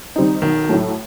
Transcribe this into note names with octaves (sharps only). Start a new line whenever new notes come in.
D#3 G3 C4 D#4
B1 D#3
A2 F#3 A3